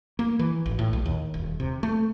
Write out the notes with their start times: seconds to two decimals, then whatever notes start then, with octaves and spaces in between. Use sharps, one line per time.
0.19 A#3
0.39 E3
0.66 G#1
0.79 A2
0.93 A#1
1.06 D#2
1.34 D#1
1.60 C3
1.83 A3